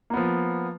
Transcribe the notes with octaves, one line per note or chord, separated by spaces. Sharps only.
F3 A#3 B3